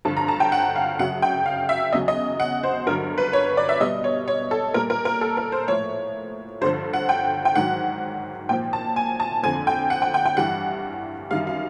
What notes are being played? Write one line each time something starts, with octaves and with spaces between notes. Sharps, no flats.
G2 D3 F3 A5
A#5
A5
G5
F#5
F5
F#2 C#3 F#3 F#5
G5
F5
E5
E2 C#3 F#3 D#5
D#5
F#5
C5
G2 D3 F#3 A#4
B4
C#5
D5
E5
B2 G3 D#5
C#5
C#5
A4
A#2 G3 A#4
A#4
A#4
A4
A#4
C5
A2 F3 C#5
G2 D3 F3 C5
F#5
G5
G5
G#2 D#3 F#3 F#5
A#2 F3 G5
A5
G#5
A5
F2 D3 F3 G#5
G5
F#5
G5
G5
G5
G2 E3 G3 F#5
F#2 D#3 G3 F5
F5